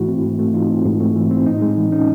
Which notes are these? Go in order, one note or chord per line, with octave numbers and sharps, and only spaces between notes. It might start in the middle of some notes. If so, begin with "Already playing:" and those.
Already playing: G#2 E3 A3 E4 F#4
C4
G#2
A3
E3 D#4 F4
C4
G#2
A3
E3
C4
A2 D#4
G#3
E3
C#4 D#4